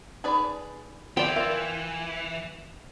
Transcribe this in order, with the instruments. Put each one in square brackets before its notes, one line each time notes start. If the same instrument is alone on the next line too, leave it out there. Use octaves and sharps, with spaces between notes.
[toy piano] D#4 B5 [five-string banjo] G#4 B4 D5
[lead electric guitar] E3 [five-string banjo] F3 D5 [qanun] G5
[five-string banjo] F4 [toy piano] A#4 E5